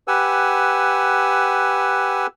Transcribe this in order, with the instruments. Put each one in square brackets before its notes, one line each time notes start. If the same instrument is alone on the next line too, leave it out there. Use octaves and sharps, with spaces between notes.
[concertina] G4 B4 F#5 G#5 E6